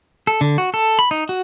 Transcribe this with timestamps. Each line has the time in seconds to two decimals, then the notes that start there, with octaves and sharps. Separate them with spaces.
0.27 A4
0.41 D3
0.58 F#4
0.74 A4
0.99 B5
1.11 D#4
1.29 F#4